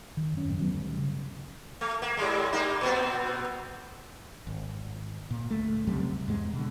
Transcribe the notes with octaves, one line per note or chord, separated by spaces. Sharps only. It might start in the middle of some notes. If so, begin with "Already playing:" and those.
D#3
F#2 C#4
F#2 A2
D#3 F#3 B3
D2 G2 D3
C#3
A3
A#3
G#2 G3 G#3
G3 A#3 D#4
A#2 B3 C4
G#1
A#2
D2 A3
C#2 F#2 C3 G3
E2 G#2 G#3
B2 D3